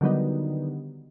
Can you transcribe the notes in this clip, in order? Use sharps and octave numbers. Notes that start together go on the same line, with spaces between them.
D3 D#3 F#3 G3 B3 D#4